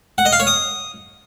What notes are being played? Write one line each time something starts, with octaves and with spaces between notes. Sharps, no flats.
F#5
D#5
F5
C#5
D#6